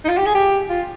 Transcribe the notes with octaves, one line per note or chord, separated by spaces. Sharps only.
D#4
F4
G4
G#4
G4
F4